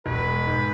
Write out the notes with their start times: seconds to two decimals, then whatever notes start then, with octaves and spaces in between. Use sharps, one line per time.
0.06 E1 B4
0.27 G#3
0.47 G#2